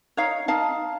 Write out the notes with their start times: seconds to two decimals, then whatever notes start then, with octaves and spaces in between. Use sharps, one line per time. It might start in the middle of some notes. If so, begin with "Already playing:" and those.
0.17 D#4 C#5 F5
0.48 D#4 F5 A5